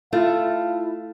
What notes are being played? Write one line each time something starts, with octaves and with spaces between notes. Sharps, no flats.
A3 E4 F4 F5